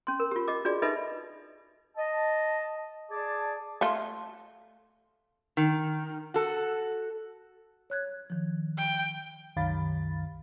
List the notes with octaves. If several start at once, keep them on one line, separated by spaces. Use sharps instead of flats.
C#4 C6
A#4
F4 G4
G4 D#5 D6
D4 F4 F#4 G#4 D5
D#4 A4 B4 D#5 E5 B5
D#5 A5
G#4 D5 A5
A3 F4
D#3
F#4 A4
C#5 F#6 G#6
D#3 F3
G5
C2 F#2 D#3 F5 B5 A6